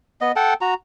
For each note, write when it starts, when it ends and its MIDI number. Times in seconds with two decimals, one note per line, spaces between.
0.21 0.32 59
0.21 0.32 75
0.36 0.54 69
0.36 0.54 78
0.36 0.54 79
0.36 0.54 81
0.61 0.74 66
0.61 0.74 82